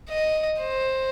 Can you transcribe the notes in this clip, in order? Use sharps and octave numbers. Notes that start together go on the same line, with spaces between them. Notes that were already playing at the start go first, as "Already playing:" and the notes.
D#5
C5